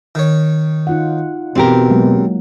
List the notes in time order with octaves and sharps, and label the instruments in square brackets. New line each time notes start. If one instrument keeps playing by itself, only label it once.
[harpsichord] D#3 C#5
[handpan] D#4 F4 F#5
[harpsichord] E2 [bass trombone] B2 [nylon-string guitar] C4 G4 A#4
[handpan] F#3 G#3 A#3